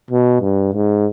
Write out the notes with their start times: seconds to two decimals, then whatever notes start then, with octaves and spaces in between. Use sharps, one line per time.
0.11 B2
0.41 G2
0.73 G#2